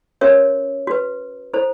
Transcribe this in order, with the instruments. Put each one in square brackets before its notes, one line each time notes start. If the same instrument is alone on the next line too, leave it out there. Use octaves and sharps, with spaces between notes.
[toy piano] C#4 F#4 A#4 C#5 E5
F#4 B4
E4 A4 C5